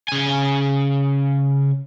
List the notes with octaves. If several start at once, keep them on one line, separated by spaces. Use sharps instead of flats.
C#3 G#5